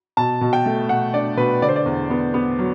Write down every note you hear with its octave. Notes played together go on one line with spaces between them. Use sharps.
B2 A5
B2
G5
A3
B2 F#5
D4 D5
B2 B4
D3 D5
C5
D5
E2
B3
B3
F#3